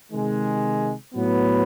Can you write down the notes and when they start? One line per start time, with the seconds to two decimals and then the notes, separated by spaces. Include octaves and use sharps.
0.12 C3 D#3 G#3
1.14 A2 F#3 B3